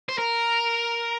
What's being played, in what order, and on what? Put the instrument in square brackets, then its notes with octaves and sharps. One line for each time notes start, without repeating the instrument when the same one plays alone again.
[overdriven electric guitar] C5
A#4